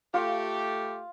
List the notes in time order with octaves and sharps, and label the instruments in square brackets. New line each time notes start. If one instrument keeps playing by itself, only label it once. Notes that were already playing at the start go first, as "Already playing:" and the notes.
[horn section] A3 G4 [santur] F4